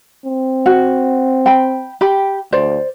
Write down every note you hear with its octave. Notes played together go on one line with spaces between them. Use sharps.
C4
F#4
G5 B5
G4 G5 B5
D2 C5 D5